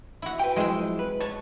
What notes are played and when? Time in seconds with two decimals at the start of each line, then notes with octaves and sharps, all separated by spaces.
0.22 E4 F#4
0.39 B4 G5
0.56 F2 F#3 G#3 E4 G5
0.99 B4
1.20 C#5 A5